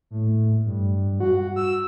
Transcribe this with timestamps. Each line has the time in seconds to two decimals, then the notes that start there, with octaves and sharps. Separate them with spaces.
0.11 A2
0.65 G2
1.20 F#4
1.56 E6